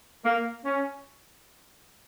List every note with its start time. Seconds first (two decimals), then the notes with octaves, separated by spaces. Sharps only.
0.24 A#3
0.65 C#4